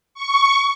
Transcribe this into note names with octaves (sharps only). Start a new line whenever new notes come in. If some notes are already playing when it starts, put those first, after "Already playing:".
C#6